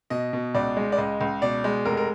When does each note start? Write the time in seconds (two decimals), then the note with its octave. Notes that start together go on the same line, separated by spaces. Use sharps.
0.10 B2 D#5
0.33 B2
0.55 C#2 D5
0.77 G#3
0.92 D5
0.98 C#2 D#5
1.21 C#2
1.42 B2 D5
1.64 G#3
1.85 F1 A#4
1.97 A#4